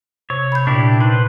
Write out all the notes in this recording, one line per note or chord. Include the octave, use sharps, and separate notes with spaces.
C3 C#5
B5 G6
A#2 D4 E4 G4
D#4 B4 C5